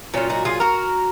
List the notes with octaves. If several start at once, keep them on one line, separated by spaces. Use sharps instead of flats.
A#2 F#3 C#4 F4
D#4 F#4
F4 G#4
F#4 A#4